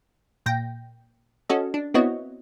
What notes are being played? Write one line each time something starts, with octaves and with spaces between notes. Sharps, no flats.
A#2 G5 A#6
C#4 F#4 A4 D#5
D4
B3 C4 E4 F#4 C#5 D#5